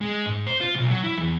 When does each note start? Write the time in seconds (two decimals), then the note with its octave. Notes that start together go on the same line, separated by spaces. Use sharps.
0.01 G#3
0.26 G#2
0.47 C5
0.61 F4
0.75 B1
0.91 F#3
1.04 E4
1.18 E2